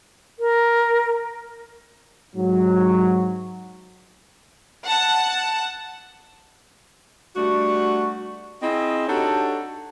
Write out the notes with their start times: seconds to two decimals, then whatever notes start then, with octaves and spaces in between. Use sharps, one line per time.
0.39 A#4
2.36 G#2 F#3
4.86 F#5 A5
7.36 G3 A3 D4 F#4
8.62 C4 E4 F4 G#4 D#5
9.08 D4 D#4 F#4 G4 A4 C#5